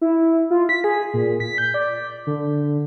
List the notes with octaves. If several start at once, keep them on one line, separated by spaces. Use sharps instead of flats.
E4
F4
B6
G#4
A#2
B6
G6
D5
D3